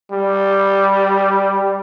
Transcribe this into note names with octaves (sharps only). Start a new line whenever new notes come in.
G3